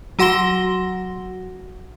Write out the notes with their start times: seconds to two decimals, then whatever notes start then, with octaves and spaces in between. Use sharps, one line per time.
0.19 F#3 F#4 F#5 C6 A#6 G7